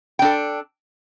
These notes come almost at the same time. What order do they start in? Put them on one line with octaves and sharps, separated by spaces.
G5 D4 A4